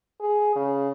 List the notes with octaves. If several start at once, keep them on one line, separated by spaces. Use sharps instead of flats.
G#4
C#3